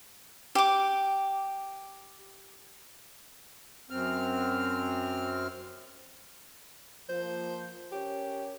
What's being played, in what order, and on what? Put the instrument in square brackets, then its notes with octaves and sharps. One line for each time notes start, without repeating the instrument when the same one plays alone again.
[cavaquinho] G4 D6
[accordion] F#2 C4 F6
[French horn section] F3 A#3 [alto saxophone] C5
[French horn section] C#4 A#4 C#5 [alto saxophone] G4